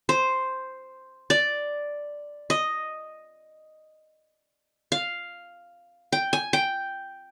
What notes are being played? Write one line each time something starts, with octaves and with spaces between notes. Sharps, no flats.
C5
D5
D#5
F5
G5
G#5
G5